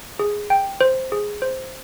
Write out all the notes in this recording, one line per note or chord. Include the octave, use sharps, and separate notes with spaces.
G#4
G5
C5
G#4
C5